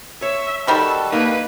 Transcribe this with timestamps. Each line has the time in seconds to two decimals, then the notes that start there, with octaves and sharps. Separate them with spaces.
0.22 C#5 E5
0.67 D#3 G3 F#4 A4
1.12 A#3 D#4 B4 D#5